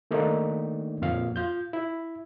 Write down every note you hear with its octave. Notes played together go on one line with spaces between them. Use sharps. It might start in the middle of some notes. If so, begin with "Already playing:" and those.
D#3 A3 A#3 D4 D#4
F2 A#2 F5
F4 G6
E4